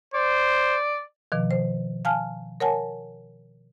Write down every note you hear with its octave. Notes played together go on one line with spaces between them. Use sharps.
C5 D5
B2 D#3 F3
C5
F5 G#5 A5 F6
A#4 C#5 F#5 G#5 A5